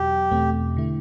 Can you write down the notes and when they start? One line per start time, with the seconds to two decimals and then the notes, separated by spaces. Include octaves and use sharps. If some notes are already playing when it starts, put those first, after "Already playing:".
Already playing: E2 B2 F#3 G4
0.31 E2 B2 A3 C4
0.77 D3 A3 E4